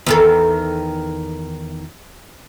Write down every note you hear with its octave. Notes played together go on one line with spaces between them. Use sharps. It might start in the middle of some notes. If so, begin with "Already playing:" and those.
E2 D#3 A4